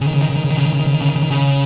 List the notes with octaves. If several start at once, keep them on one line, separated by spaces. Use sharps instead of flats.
C#3
D#3
C#3
D#3
C#3
D#3
C#3
D#3
C#3
D#3
C#3
D#3
C#3
D#3
C#3
D#3
C#3
D#3
C#3